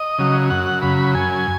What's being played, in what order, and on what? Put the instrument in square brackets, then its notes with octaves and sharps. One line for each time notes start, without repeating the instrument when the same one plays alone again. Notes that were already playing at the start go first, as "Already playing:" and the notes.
Already playing: [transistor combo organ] D#5
C#3 F#3
F#2 F#5
C#3 F#3 B5
F#2 G#5